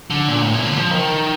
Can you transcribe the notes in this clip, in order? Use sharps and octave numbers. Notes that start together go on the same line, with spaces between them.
D3
A#2
A2
A#2
D3
F3
D#3